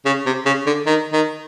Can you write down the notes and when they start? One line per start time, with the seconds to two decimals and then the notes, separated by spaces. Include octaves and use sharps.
0.06 C#3
0.26 C3
0.46 C#3
0.66 D3
0.86 D#3
1.13 D#3